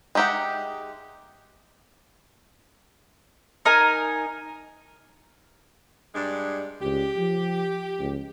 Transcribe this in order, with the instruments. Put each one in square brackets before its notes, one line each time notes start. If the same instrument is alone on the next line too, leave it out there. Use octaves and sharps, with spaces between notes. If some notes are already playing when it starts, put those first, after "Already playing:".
[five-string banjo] G#3 D#4 G4 E5 F#5
[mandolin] D#4 A#4 G#5
[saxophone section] G2 G#3 D4
[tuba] C#2 [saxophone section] G4
[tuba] F3
C#2